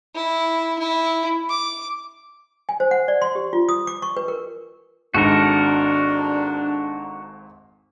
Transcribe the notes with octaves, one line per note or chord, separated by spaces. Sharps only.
E4
E4
D6
G#5
C5
F#5
D5
C6
G4
F4
D#6
D6
C#6
B4
A#4
G#1 G#2 D4 F#4 A4 A#4